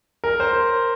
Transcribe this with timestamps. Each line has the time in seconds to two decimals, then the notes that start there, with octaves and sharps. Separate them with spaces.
0.24 A#4
0.40 C5